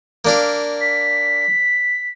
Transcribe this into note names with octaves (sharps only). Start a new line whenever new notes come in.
A#3 D4 F5
B6